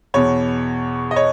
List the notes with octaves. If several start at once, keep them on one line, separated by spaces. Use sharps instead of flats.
E2 B2 C#5
D#5
C#5